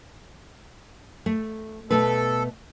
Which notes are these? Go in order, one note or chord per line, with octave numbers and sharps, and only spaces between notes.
A3
B2 A3 A4 B4